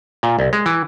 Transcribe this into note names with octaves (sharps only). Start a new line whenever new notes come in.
A#2
C2
G#3
E3